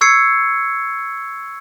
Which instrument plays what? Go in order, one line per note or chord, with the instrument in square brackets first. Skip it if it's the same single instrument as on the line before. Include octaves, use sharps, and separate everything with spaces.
[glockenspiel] C#6 E6 G#6 C7 C#7